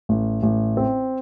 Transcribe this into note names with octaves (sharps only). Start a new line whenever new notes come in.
A1
A1
C4